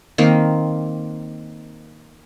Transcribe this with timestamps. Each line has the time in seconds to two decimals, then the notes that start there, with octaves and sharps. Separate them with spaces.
0.18 D#3 A#3 C4